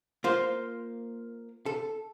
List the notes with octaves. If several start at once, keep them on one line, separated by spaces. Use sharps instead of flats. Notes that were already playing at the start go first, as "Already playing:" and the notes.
A#3 F4 C5
A4